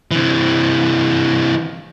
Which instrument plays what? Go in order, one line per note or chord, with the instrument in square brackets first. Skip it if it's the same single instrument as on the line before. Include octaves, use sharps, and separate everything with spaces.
[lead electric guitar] C3 E3